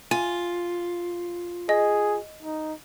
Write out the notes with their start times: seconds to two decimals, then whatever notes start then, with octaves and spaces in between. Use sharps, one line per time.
0.11 F4 G#5
1.69 G#4 D#5
2.43 D#4